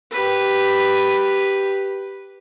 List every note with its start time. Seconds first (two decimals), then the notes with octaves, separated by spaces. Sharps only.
0.11 G4 B4